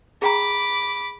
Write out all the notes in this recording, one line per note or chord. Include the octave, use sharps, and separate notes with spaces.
G#4 G5 A#5 B5 D6